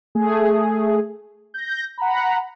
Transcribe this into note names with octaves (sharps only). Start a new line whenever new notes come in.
A3 G#4
G6 A#6
F#5 A#5 B5